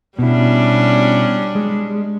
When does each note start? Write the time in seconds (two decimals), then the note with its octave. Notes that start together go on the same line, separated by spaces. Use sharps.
0.19 B2 G3 C#4 D4 E4
1.55 G#3